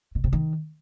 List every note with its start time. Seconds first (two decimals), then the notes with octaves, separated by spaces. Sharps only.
0.15 B2
0.24 C3
0.33 D#3